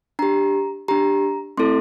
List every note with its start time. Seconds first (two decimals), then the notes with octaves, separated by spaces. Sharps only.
0.19 D4 G4 A#5
0.88 D4 G4 A#5
1.57 A3 C4 E4 A4 C6